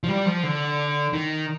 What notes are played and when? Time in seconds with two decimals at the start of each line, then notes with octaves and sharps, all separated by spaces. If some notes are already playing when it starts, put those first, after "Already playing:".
0.03 F3
0.09 G3
0.26 F3
0.43 D3
1.13 D#3